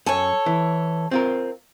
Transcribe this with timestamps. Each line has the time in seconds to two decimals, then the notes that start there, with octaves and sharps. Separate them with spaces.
0.06 F#2 A4 C#5 G#5
0.46 E3
1.11 C4 F4 A#4